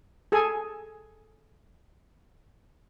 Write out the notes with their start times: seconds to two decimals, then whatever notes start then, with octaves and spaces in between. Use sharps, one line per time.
0.32 G#4 A4 G#5